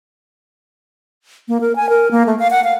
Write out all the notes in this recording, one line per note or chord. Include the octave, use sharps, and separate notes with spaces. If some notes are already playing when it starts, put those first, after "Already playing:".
A#3
A#4
G#5
A#4
A#3
A3
F5
F#5
F5